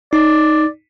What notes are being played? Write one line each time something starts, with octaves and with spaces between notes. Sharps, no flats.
D#4 D5